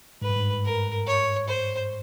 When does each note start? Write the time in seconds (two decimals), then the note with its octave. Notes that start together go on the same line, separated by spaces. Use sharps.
0.22 G#2 B4
0.29 G2
0.36 G#2
0.65 A#4
1.07 C#5
1.48 C5